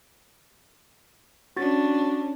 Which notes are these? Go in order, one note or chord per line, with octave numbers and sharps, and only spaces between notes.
C#4 D4 F#4 A6